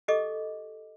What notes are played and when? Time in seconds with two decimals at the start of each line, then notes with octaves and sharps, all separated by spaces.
0.08 G4 A4 D#5 D6